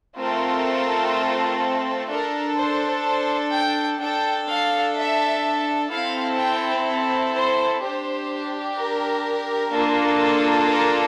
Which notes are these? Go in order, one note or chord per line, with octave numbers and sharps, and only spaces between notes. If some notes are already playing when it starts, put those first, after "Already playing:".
A3 C4 F4 A4 A#4
D4 A4 A#4
C5
C5
G5
D4 A4 G5
F5
E5
C4 E4 A4 F5
G5
C5
D4 G4 C5
A#4
A#3 D4 F4 A4
A#4